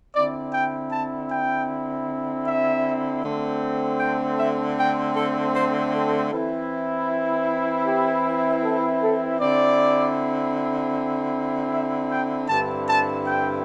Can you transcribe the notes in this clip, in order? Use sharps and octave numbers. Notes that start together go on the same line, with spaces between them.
D3 C4 E4 D5
G5
A5
G5
E5
D3 A3 C4
G5
E5
G5
A4
C5
A4
E3 C4 E4
G4
A4
A4
D3 C4 E4 D5
E5
G5
G2 D3 C4 E4 A5
A5
G5